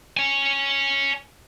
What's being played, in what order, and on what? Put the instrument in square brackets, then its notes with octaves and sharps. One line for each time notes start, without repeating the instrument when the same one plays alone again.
[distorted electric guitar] C#5 G#5